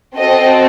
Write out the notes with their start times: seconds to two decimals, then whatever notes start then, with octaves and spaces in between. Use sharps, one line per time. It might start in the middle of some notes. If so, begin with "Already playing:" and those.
0.17 C4 F#4 A4 D#5